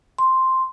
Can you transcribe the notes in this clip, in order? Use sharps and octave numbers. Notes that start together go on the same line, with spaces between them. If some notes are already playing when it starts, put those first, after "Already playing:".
C6